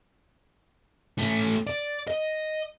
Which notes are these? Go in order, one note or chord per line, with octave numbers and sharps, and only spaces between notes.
A3 C#4
D5
D#5